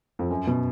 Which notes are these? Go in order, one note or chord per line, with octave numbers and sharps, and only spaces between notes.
F2
F#2
B2